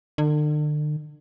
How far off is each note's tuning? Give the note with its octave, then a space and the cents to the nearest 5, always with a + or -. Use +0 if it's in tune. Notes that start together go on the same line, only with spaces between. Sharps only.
D3 +40